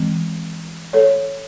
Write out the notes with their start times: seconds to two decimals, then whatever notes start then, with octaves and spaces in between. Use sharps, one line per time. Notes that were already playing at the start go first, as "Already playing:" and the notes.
Already playing: E3 G#3 C4
0.93 A4 C#5